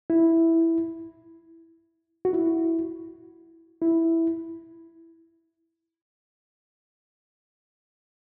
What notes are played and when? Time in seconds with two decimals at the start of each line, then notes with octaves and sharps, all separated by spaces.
0.10 E4
2.25 F#4
2.33 E4
3.81 E4